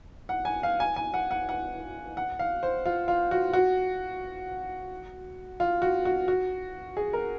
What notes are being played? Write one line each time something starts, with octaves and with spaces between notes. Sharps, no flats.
F#5
G#5
F5
G#5
G#5
F#5
F#5
F#5
F#5
F5
C5
F4
F4
F#4
F#4
F4
F#4
F#4
F#4
G#4
A#4